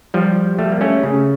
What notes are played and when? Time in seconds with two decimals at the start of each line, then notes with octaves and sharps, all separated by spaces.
0.14 F3 G3
0.59 G3 A3
0.72 A#3
0.81 A3 C#4
1.03 C#3